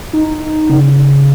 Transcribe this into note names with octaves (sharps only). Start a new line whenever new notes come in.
D#4
C#3